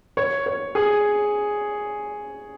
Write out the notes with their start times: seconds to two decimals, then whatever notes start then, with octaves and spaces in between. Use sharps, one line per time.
0.17 C#5
0.46 C#5
0.75 G#4